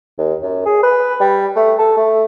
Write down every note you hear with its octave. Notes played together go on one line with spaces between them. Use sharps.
D#2
F#2
G#4
B4
G3
A3
A4
A3